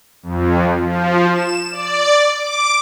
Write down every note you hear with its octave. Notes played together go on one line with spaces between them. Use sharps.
F2
F3
E7
D5
D6